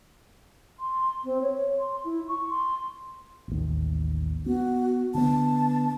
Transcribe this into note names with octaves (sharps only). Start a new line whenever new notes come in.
C6
C4
C#5
C6
E4
C#6
C6
A1 D#2
B3 F#4
D3 B3 A5